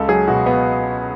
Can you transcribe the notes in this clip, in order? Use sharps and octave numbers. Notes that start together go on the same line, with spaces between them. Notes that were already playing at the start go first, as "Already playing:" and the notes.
Already playing: C#2 A4
F#3 G#4
B2 F#4
B3